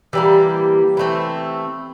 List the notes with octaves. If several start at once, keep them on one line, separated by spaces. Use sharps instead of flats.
E3 G3 A#3 G4
E3 A3 C4